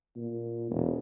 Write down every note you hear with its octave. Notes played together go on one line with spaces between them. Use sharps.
A#2
E1